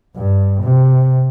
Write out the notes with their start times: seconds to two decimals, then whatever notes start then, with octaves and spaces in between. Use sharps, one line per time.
0.16 G2
0.63 C3